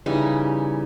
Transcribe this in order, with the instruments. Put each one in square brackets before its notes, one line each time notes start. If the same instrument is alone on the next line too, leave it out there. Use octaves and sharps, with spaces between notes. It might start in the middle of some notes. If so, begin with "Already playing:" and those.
[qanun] C#3 D#4 [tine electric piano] E3 G3